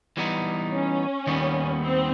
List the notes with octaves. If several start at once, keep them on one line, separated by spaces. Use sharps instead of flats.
E3 G3 B3 D#4
C#4
D#2 D#3 G3 B3
C4